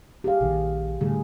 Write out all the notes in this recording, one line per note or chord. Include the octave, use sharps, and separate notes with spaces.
G4 G#4 F5
A#1 D#3
A2 D3 G3 G#4